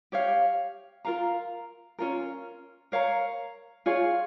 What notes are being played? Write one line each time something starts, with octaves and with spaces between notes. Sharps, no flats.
G4 C#5 F5
F4 A#4 F5 A#5
C#4 F4 A#4
A#4 C#5 F5 A#5
F4 G#4 C#5 F5